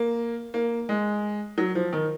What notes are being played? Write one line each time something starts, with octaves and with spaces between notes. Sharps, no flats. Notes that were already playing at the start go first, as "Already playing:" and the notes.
Already playing: A#3
A#3
G#3
F#3
F3
D#3